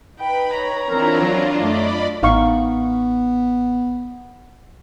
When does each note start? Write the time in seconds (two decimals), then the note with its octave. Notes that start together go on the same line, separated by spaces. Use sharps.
0.19 D#4 B4 G5 B5
0.54 C#5 A#5
0.89 E3 C4 D4 E4 F4 A#4
1.21 F#3
1.60 F#2 A3 D5 D#5 B5 D6
2.23 A1 B3 D#4 F5 C#6